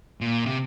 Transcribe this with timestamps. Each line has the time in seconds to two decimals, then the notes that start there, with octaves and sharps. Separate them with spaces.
0.21 A#2
0.46 C3